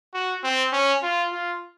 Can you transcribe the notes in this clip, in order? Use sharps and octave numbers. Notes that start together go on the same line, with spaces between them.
F#4
C4
C#4
F4
F4